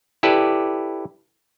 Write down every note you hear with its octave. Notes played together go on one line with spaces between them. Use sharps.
E4 G4 A4 B4 D5